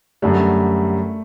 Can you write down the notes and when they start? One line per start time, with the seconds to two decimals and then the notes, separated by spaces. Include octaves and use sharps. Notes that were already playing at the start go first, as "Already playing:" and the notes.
0.22 F#2 D3 G3 A3